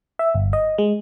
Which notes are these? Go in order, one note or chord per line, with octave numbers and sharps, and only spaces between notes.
E5
G1
D#5
G#3